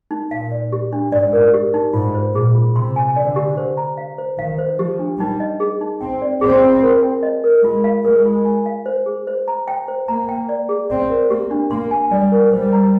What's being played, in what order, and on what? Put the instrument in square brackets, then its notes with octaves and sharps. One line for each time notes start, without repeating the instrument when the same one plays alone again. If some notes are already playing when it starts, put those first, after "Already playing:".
[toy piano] D#4
[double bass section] A#2 [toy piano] F5
[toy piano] D5
G4
D4
[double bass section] G#2 [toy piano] D5
[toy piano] A#4
G4
D#4
[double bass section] G#2 [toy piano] F4
[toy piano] C5
[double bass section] A#2 [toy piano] G#4
[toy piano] F4
[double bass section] C3 [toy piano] C6
[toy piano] G#5
[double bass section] D3 [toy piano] D5
[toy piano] G4
C5
A#5
F5
C5
[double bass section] D#3 [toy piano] F5
[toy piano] C5
[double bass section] F3 [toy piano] G4
[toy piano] D4
[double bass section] G3 [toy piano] D#4
[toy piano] D#5
G#4
D#4
[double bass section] C4 [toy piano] G5
[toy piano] D5
[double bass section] C4 [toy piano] G#4
[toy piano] F4
A#4
G5
D#5
A#4
[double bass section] G#3 [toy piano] F4
[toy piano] F5
[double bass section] G#3 [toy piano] A#4
[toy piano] F4
G#5
F5
C5
G#4
C5
A#5
G5
C5
[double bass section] A#3 [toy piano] A#5
[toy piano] G5
D5
G#4
[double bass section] C4 [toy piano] D5
[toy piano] A#4
[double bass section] A#3 [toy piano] G4
[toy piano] D4
[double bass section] A#3 [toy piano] C6
[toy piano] G#5
[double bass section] G3 [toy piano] D5
[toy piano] A#4
[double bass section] G3 [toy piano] C5
[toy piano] A#5